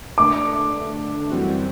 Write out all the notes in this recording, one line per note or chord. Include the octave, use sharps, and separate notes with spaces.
D3 A3 D4 D6
F#2 E3 G3 C4 F#4